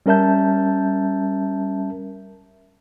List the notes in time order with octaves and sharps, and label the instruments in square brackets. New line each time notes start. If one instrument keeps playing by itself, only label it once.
[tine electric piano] G3 C#4 A#4 E5 A5 G6